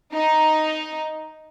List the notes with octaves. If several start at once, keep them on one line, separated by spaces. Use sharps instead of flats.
D#4